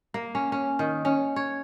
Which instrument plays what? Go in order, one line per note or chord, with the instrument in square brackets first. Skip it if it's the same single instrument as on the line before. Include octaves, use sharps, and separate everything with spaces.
[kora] A#3
C#4
C#4
D#3
C#4
C#5